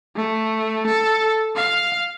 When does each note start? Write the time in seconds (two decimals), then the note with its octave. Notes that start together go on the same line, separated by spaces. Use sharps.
0.16 A3
0.87 A4
1.55 F5